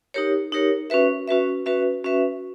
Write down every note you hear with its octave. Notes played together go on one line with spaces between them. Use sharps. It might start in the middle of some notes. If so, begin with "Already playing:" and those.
D#4 G4 A#4 C#5
D#4 G4 A#4 C#5
C#4 F#4 B4 E5
C#4 F#4 B4 E5
C#4 F#4 B4 E5
C#4 F#4 B4 E5